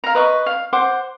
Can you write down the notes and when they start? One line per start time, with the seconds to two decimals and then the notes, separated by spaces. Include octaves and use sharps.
0.04 F5 A#5
0.15 B4 D#5 C#6
0.46 F5
0.73 C5 F#5 C6 D6